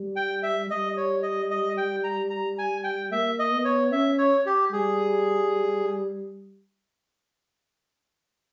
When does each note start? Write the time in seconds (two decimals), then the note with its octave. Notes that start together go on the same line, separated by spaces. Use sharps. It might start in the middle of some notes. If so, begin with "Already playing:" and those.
Already playing: G3
0.16 G5
0.43 E5
0.70 G3 D#5
0.97 C#5
1.23 D#5
1.51 D#5
1.77 G5
2.04 A#5
2.30 A#5
2.58 G#5
2.84 G5
3.11 A#3 E5
3.39 D#5
3.52 B3
3.65 C#5
3.92 C#4 E5
4.18 C#5
4.46 G4
4.72 G3 G#4